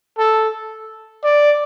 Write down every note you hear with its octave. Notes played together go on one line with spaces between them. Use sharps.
A4
D5